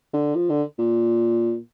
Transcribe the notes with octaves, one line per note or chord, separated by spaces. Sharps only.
D3
F3
D3
A#2